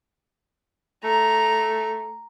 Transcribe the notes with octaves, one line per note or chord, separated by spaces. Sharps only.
A3 A#5